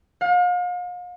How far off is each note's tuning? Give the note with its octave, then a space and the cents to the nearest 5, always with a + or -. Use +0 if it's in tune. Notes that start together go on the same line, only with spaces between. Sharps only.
F5 +40